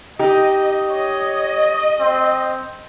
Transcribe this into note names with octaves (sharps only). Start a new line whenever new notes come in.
D#4 G4 D#5
C#5 D#5
C4